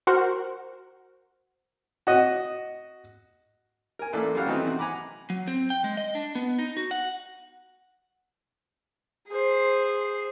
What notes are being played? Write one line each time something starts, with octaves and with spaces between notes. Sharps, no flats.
F#4 A#4 C5 F#5
F#4 D#5
A#4 G#5
A1 A3 A#3 A4 D5 E6
F#2 G3 F5 F#5
D#3 E3 F#3 A3 C4 D#4
C3 F#4
F#5 G#5 A#5 B5 D6
F#3
C4
G5
G#3
D#5
D4
B3
D#4
F#4
F#5
G#4 C5